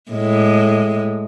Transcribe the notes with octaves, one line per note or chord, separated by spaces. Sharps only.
A2 G#3